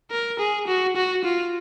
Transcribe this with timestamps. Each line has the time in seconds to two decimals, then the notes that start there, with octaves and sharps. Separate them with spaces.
0.11 A#4
0.39 G#4
0.68 F#4
0.96 F#4
1.24 F4